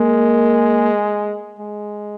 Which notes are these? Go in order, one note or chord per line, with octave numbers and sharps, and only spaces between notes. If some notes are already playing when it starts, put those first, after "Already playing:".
Already playing: G#3 A#3
G#3